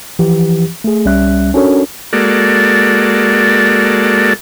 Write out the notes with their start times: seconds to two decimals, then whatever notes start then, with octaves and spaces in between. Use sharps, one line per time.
0.19 E3 F3 G4
0.84 A3 G#4
1.05 C2 G3 C#4 E5 F#6
1.54 C#4 D4 F#4 A4 A#4 C#5
2.13 G#3 A#3 F#4 A4 D5